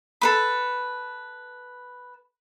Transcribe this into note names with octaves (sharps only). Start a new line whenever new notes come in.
A4 B4 B5